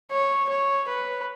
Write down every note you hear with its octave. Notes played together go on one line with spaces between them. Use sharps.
C#5
C#5
B4